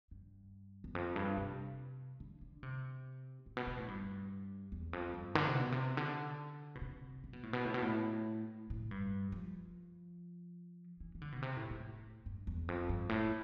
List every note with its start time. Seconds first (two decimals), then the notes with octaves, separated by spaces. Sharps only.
0.11 G2
0.84 E2
0.95 F2
1.16 G2
1.37 C3
2.20 D3
2.41 D3
2.63 C3
3.46 A2
3.57 B2
3.67 B2
3.78 A2
3.88 G2
4.72 E2
4.93 F2
5.14 G2
5.35 D3
5.47 C3
5.60 B2
5.72 C3
5.97 D3
6.75 B2
6.81 C3
7.24 C3
7.33 B2
7.43 A2
7.53 B2
7.65 A2
7.74 B2
7.82 A2
8.70 A2
8.91 G2
9.32 F3
11.00 E3
11.15 E3
11.21 D3
11.32 B2
11.42 C3
11.56 A2
11.70 A2
12.26 G2
12.47 E2
12.68 F2
12.89 G2
13.09 A2